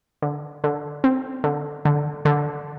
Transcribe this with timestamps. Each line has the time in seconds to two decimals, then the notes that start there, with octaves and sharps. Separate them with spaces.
0.22 D3
0.64 D3
1.04 C4
1.44 D3
1.85 D3
2.25 D3